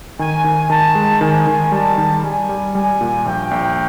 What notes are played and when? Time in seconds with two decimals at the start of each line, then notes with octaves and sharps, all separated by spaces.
0.19 D#3 G#5
0.44 D#3
0.70 D#3 A5
0.95 G#3
1.21 D#3 G#5
1.47 D#3
1.72 G3 A5
1.98 D#3
2.23 G3 G#5
2.49 G3
2.75 G3 G#5
3.01 A#2
3.26 A#1 G5
3.51 A#1